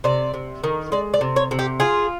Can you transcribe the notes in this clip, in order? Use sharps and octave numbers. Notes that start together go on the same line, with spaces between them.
C3 D5
C3
D#3
G#3 D5
D5
C3
C#5
C3
G4
F4 G#4